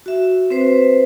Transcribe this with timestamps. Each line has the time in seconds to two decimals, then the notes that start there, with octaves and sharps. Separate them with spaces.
0.06 F#4 E5
0.50 C4 B4 C5